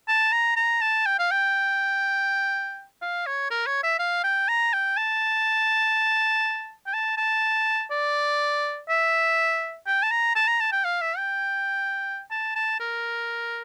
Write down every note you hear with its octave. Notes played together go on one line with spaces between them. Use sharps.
A5
A#5
A#5
A5
G5
F5
G5
F5
C#5
A#4
C#5
E5
F5
G5
A#5
G5
A5
G5
A5
A5
D5
E5
G5
A5
A#5
A5
A#5
A5
G5
F5
E5
G5
A5
A5
A#4